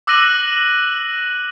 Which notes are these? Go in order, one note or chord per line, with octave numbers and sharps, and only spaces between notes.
D6 E6 F#6 A#6 D#7 F#7